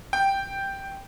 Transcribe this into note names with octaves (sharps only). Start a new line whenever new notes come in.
G5